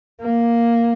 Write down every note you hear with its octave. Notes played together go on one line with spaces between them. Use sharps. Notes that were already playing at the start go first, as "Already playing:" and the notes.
A#3